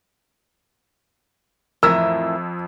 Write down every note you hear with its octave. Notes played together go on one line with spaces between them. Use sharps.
F2 A2 E3 A#4 E6